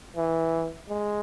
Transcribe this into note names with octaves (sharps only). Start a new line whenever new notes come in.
E3
G#3